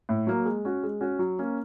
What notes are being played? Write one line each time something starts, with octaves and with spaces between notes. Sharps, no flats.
A2
F#3 A#3
G#3
C#4 F#4
G#3
C#4 F#4
F#3
A#3 C#4